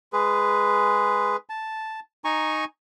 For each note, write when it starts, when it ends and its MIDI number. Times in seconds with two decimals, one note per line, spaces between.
0.13 1.36 56
0.13 1.36 68
0.13 1.36 71
1.50 2.00 81
2.24 2.65 63
2.24 2.65 80
2.24 2.65 82
2.24 2.65 85